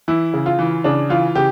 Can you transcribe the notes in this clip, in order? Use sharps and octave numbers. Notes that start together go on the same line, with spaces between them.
E3 E4
C#3
F4
E3
C#3 D4
E3 F4
C#3 G4